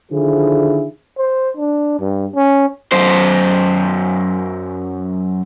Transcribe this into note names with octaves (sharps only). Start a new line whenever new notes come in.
D3 D#3 F3 E4 G#4
C5
D4
G2
C#4
F#2 C5